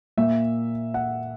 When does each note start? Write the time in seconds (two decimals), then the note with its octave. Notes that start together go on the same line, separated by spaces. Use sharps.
0.17 A#2 A#3 E5
0.94 F#5